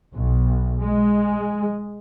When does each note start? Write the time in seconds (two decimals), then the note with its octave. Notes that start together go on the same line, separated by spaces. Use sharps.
0.13 B1
0.82 G#3